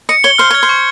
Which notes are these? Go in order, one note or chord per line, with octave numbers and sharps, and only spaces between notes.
D#5 C#7
C#5 G7
C5 F6
C#5 G#6
C5
C#6